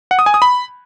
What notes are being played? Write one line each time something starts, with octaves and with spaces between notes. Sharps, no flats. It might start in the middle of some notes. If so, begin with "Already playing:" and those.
F#5
D#6
G#5
D#6
B5